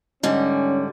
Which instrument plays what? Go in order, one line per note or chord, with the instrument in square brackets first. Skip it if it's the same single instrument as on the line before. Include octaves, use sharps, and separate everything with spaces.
[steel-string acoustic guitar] G#2 D3 G3 [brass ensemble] C#4